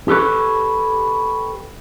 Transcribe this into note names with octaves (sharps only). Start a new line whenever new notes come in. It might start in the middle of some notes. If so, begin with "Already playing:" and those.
G4 A4 B4 C#5